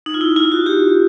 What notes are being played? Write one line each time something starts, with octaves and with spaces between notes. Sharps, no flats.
D#4
F4
E4
F4
F#4
G4